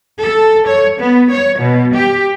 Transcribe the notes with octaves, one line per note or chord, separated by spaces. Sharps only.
A4
C#5
B3
C#5
B2
G4